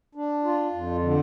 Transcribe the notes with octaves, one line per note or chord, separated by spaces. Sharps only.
D4
F4
F2
D3